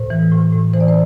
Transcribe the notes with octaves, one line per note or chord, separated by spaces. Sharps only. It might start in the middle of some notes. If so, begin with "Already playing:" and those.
Already playing: A2 C5
E3
A2
A2
E3 C5
D5
C5